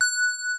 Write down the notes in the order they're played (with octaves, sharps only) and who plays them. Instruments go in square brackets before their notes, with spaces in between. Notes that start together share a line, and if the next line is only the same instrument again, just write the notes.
[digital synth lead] F#6